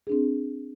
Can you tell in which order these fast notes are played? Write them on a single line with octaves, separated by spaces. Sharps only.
G#4 D4 C4